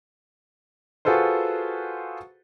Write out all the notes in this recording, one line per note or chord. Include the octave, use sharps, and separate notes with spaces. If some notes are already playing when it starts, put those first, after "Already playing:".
F4 F#4 G#4 A4 B4 C5